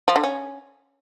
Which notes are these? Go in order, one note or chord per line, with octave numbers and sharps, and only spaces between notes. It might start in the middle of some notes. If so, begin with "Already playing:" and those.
F3
D3
C#4